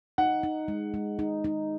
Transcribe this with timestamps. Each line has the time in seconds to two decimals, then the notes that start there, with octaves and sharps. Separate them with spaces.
0.18 D#4 F#5
0.43 D#4
0.68 G#3
0.94 G#3
1.19 D#4
1.44 D#4